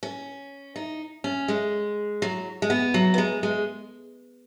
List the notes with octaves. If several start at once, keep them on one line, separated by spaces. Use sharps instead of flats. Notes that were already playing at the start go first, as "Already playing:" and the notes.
C#4
D#4
C#4
G#3
F#3
G#3
B3
F#3
B3
G#3
G#3